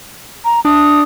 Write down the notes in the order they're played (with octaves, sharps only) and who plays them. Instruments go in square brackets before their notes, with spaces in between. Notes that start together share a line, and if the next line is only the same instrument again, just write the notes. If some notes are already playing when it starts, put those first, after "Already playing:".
[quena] A#5
[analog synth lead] D4 [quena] D#6